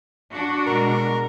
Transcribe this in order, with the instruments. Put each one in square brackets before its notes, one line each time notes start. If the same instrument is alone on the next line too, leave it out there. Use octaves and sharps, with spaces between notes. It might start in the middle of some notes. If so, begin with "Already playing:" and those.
[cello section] D4 F#4
[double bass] B2 G#3 [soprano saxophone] A#4